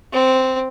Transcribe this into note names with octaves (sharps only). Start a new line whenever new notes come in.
C4